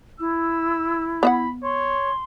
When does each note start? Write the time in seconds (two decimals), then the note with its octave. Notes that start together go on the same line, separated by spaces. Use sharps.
0.20 E4 E6
1.23 B3 E5 F#5 B5
1.64 C#5 C6